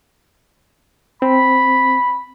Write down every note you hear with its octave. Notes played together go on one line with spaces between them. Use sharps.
C4 B5